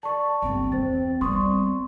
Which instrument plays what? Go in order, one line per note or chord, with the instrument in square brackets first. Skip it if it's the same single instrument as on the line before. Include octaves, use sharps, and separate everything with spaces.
[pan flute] D5 [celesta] A5 C#6
[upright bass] G1 D#2 [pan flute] C4
[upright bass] E2 [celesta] C5 A6
[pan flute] G3 [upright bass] B3 C4 [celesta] C6 C#6 D#6